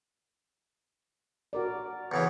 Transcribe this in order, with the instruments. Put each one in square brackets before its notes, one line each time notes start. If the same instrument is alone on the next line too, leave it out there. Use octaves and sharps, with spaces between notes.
[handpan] F#4 A#4 D5
[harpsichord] E2 C#3 E3